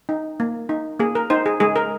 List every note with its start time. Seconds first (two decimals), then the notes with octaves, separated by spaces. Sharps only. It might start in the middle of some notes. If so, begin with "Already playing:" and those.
0.09 D#4
0.40 A#3
0.69 D#4
0.99 A#3 G#4
1.15 A#4
1.30 D#4 C5
1.46 G#4
1.60 G#3 G#4
1.76 A#4